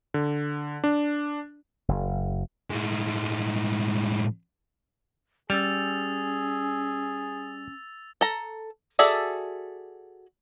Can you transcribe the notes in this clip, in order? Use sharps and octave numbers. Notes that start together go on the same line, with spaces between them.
D3
D4
F#1
A2 G#3
G3 C#4 G#4 E6 A6 F7
A4 A#5
F#4 G#4 A4 D5 E5